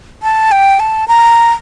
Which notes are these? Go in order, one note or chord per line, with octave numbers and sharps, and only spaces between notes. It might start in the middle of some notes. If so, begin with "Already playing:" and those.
A5
G5
A5
A#5